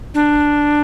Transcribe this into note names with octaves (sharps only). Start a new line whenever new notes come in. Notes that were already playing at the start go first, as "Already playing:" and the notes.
D4